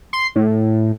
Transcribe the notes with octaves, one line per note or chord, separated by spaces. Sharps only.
C6
A2